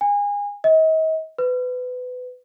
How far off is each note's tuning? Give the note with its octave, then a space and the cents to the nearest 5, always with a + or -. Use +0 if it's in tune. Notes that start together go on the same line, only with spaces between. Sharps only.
G#5 -30
D#5 +40
B4 +25